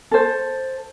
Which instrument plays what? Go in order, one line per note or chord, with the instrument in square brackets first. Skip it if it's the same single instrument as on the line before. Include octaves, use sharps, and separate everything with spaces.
[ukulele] A4 C5